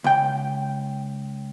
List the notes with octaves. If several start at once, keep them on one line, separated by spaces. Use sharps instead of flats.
C#2 G5